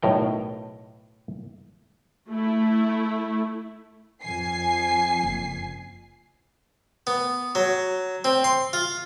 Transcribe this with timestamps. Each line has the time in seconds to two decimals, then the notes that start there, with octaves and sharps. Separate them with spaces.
0.02 B1 A2 A#4 G5
2.30 A3 E4
4.23 F2 G#5 C7
5.23 F#1
7.07 B3
7.55 F#3
8.24 C4
8.44 C6
8.73 F4